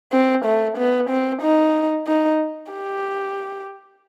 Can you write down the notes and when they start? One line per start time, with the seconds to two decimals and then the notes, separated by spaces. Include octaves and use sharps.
0.12 C4
0.45 A3
0.77 B3
1.09 C4
1.42 D#4
2.07 D#4
2.72 G4